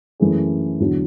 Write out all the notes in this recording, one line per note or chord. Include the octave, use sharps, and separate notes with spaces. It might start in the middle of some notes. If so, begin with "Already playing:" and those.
F#2 E3 A3 C#4 G#4
E2 D3 F#3